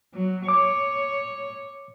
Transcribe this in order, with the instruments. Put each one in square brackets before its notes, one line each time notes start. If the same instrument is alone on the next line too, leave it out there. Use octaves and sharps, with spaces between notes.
[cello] F#3
[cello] C#5 [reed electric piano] D6